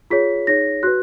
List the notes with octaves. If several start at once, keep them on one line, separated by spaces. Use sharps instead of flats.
F4 G#4 C#5 B6
D#4 G#4 C#5 A#6
F#4 B4 F#6